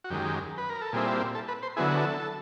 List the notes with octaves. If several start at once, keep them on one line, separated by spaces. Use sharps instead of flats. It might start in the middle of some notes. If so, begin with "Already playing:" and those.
F#4
F#2 D#3 G#3 G4
B4
A#4
A4
A#2 G3 C4 E4 G#4
A4
B4
C5
D3 F#3 B3 E4 G#4
A4